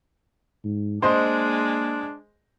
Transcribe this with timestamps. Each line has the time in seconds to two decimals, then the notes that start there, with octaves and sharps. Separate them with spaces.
0.64 G#2
1.02 G#3 A#3 D4 C5 D#5 C6